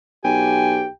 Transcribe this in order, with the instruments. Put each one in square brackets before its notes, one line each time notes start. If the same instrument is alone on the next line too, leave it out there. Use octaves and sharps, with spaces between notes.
[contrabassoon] B1 [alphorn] G4 [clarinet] G5 [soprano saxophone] G#5